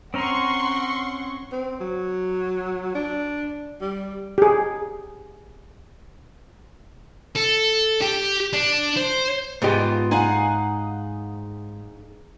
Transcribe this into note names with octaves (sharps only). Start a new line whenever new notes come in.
C4 C#4 F#5 A#5 C6 C#6
C4
F#3
D4
G3
G4 G#4
A4
G4
D4
C5
G#2 B3 F4 G4 D#5
D#4 G#4 F5 F#5 G#5